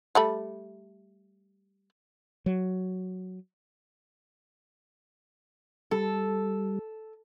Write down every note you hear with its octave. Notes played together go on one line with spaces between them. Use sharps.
G3 A3 B5
F#3
G3 A4